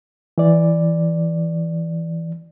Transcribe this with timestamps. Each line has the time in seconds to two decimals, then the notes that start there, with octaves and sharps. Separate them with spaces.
0.38 E3 D5